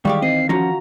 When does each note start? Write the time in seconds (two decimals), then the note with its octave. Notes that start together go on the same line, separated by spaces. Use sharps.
0.05 D#3 E3 G3 G#3 G4 D5 F5 C#6
0.22 C4 D#5 C7
0.49 F3 C#4 F4 F#4 A#5 A#6